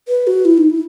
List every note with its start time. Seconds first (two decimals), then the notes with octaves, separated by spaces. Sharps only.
0.08 B4
0.27 F#4
0.45 E4
0.58 D#4
0.70 E4